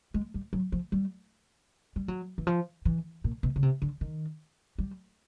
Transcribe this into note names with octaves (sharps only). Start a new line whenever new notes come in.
G#3
G3
F#3
F3
G3
G3
F#3
E3
F3
E3
A#2
B2
C#3
C3
D3
D#3
G3